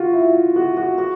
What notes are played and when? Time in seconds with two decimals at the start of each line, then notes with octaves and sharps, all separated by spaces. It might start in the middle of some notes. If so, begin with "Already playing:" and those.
Already playing: F4 F#4
0.13 E4
0.56 F#4
0.77 F#4
0.98 F#4